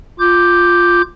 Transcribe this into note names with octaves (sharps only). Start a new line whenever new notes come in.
F4 D6 G6